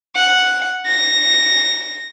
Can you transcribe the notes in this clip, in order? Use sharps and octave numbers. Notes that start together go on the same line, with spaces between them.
F#5
A#6